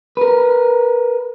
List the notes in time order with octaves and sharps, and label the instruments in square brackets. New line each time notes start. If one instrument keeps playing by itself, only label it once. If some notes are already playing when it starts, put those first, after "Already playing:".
[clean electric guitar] A#4 B4